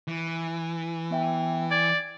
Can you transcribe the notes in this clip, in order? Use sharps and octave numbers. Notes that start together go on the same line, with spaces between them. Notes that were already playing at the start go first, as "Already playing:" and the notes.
E3
B3 E5 G5
D5 G#6